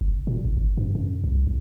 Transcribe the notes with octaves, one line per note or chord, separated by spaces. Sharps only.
F#1
A#2
G#1
G1
G2
F#2
C2
C2